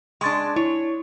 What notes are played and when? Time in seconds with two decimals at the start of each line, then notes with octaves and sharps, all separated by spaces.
0.21 G#3 D4 C6 C#6 A6
0.56 E4 C#5